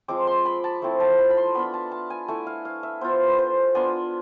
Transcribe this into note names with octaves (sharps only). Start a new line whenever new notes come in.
F3 G#3 C4 D6
C6
B5
A5
F3 A3 C4 E4
A5
B5
B5
C6
B3 D4 F4 B5
A5
A5
G#5
A3 E4 G#5
F5
F5
E5
B3 F4 C5
B4
C5
B3 D4 F4 G#5